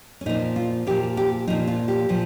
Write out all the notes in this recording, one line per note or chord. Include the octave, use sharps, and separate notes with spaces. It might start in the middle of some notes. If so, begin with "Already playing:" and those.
C#4
A#2 F3 D#4
F4
A#2 F3 G4
G4
A#2 F3 D#4
F4
G4
A#2 F3